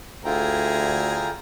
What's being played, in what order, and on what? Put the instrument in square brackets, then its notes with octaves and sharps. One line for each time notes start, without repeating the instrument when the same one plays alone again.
[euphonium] D2 [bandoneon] D3 F4 G5 [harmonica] E4 G#4 A#5